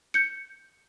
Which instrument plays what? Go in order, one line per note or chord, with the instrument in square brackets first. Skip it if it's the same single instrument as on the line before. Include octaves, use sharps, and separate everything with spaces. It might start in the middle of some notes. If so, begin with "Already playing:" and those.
[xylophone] G6 C#7